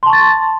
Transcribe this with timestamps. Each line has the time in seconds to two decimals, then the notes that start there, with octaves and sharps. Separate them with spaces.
0.03 C6
0.06 A5
0.10 C#6
0.13 A6